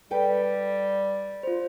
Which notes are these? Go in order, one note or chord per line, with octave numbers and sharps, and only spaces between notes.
G3 A4 B4 G5
F4 C5